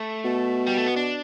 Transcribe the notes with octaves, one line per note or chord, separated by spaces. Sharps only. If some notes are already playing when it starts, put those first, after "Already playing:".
Already playing: A3
B2
G3
A3
B3
D4